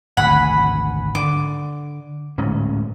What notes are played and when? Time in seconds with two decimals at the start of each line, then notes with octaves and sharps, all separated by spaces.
0.17 G#1 D2 F#5 G#5 B5
1.15 D3 D6
2.38 D1 G#2 C#4